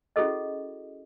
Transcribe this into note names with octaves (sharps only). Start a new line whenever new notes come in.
C#4 E4 F#4 G#4 A4 D#5